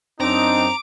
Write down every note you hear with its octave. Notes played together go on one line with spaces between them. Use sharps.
F#2 C4 D4 D#4 A#5 D6